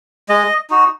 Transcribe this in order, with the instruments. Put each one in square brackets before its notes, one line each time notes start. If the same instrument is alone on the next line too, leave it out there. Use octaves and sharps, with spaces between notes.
[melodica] G#3 D#5
D#4 F#4